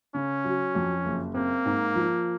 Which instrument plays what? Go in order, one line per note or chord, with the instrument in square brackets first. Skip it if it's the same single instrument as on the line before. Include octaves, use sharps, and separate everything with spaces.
[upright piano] C#3 [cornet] C#4
[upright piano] F#3
F2
F#1
[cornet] A#3 [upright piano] C4
[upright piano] G#2
F3